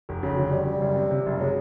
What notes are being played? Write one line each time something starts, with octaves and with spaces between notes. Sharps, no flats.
F1
C#3 F#3
D2 F#3
F#3 G3
C#3 G3
F#1
C3
C3
F#1
F#3 G#3